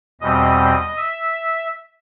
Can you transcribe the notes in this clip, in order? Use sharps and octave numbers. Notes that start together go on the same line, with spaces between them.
E2 B2 G3 C4 D#5
E5